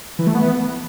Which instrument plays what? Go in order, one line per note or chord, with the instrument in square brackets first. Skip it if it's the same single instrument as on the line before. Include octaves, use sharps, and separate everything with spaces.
[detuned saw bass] E3
A3
B3